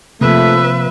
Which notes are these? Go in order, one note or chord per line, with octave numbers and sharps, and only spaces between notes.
C3 F3 A3 A#3 B4 E5